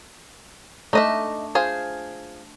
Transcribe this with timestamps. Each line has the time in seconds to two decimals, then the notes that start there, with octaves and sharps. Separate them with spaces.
0.93 A3 D4 D#4 D#5 E5
1.55 F4 G#4 C5